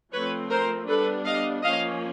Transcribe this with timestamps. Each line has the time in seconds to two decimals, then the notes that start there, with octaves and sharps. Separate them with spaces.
0.13 F3 A3 C4 B4 C#5
0.51 A#4 C5
0.88 G3 B3 D4 A4 B4
1.26 D#5 F5
1.63 F3 A#3 C#4 D#5 F5